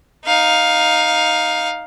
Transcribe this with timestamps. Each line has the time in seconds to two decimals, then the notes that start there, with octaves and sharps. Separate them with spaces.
0.25 D#4 F5